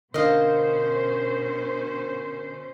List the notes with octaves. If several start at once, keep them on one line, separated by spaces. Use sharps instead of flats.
B2 D3 C#4 D4 A#4 C5 D#5 F5